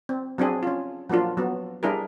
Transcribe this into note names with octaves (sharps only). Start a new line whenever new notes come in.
C4
F#3 C4 D4 G#4
C#4 F4
F3 F#3 A#3 D4 F4
F#3 B3
G3 D4 E4 G#4 A#4